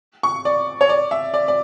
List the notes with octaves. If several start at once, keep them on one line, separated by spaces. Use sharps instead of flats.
C#6
D5
C#5
D5
E5
D5
D5